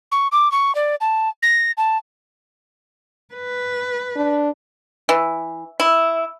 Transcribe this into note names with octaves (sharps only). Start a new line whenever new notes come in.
C#6
D6
C#6
D5
A5
A#6
A5
B4
D4
E3
E4